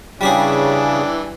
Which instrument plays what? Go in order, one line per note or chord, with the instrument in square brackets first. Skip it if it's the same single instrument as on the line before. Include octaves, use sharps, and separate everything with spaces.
[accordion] C#3 [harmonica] E3 D4 [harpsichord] G3 G4 G#4